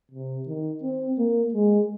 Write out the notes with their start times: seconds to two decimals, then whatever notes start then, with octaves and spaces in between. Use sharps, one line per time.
0.11 C3
0.47 D#3
0.83 C4
1.18 A#3
1.54 G#3